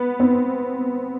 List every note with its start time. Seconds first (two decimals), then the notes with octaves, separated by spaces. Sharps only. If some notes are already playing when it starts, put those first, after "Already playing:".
Already playing: B3
0.20 C4